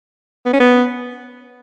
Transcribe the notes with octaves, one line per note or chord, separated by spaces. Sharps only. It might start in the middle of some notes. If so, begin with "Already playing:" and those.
B3
C#4
B3